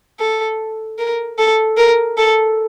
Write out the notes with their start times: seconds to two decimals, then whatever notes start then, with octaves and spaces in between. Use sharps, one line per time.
0.19 A4
0.98 A#4
1.38 A4
1.77 A#4
2.17 A4